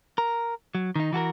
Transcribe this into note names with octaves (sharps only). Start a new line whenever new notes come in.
A#4
F#3
D#3 D#4
E3 F#4 A4 A#4